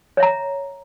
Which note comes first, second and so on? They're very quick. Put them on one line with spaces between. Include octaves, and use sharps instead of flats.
C#5 E5 A#5